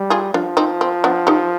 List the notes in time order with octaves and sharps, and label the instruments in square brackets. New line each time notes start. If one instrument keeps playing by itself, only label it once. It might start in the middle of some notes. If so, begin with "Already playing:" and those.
Already playing: [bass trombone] G3
[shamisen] F4 G#4
[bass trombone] F3 [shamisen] D4 F4
[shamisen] C4 D#4
C4
B3 D4
D#4 G4